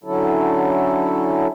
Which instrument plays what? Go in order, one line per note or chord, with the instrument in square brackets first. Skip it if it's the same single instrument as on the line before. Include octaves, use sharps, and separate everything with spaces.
[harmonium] D3 F#3 C#4 E4 A4